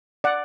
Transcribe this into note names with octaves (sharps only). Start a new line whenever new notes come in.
D5 F#5